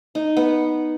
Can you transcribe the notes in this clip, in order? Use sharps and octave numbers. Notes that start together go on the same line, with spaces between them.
D#4
B3